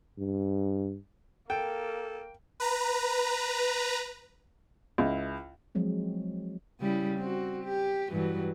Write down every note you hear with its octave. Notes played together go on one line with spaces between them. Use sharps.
G2
A#3 A4 G5
B4 A#5
C#2 E4
F3 F#3 G#3 C4
C#3 G3 E4
C4 F#4
G4
G2 E3 F#3